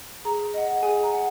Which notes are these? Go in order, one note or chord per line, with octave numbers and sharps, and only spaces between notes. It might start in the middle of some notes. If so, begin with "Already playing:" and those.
G#4 A#5
D#5 F#5
G#4 G#5
A#5
F#5